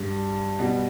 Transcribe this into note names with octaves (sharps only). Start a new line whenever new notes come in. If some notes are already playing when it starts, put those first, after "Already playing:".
Already playing: G2 G3
B2 G3